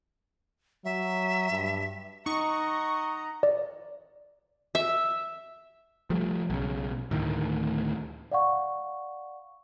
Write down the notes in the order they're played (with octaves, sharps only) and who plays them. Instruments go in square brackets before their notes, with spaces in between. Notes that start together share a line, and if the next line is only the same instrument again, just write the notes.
[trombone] F#3 [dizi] E5
[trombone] G2
[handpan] D#4 [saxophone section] D#5 F#5 [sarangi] A#5 [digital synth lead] C#6
[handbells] D5
[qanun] E5
[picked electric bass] F3 G3 A3
B1 C#3
D2 A2 D#3
[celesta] D5 F5 F#5 C#6